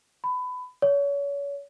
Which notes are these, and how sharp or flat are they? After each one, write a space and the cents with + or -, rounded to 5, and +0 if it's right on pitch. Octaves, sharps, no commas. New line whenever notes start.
B5 +20
C#5 +35